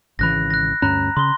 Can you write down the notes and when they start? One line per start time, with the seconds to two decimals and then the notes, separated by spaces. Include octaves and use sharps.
0.19 G#1 C#3 E3 B5 F#6 A#6
0.50 F#6 A#6
0.82 D2 G2 C#4 A#5 B5 F#6
1.17 C#3 C6 G7